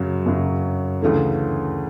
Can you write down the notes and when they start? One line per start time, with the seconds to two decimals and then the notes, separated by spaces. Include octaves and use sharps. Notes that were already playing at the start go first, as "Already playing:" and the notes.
Already playing: F#2 C#3 F#3
0.26 F#2 C#3 F#3
1.02 D2 C#3 E3 A3